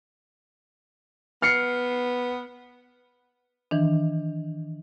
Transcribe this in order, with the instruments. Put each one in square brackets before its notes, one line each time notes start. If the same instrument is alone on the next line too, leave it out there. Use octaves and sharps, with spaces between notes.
[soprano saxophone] B3 [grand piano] F6 C7 C#7
[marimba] D#3 E3 D4